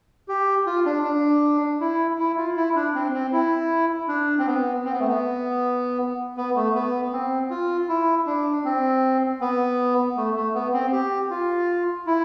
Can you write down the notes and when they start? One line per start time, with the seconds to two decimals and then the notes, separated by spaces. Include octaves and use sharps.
0.28 G4
0.67 F4
0.85 D4
1.04 D4
1.80 E4
2.19 E4
2.37 F4
2.56 E4
2.75 D4
2.94 C4
3.13 C4
3.32 E4
4.08 D4
4.39 C4
4.46 B3
4.85 C4
4.92 B3
5.00 A3
5.08 B3
6.37 B3
6.55 A3
6.75 B3
7.12 C4
7.50 F4
7.88 E4
8.26 D4
8.64 C4
9.41 B3
10.16 A3
10.36 A3
10.55 B3
10.73 C4
10.92 G4
11.30 F4
12.07 E4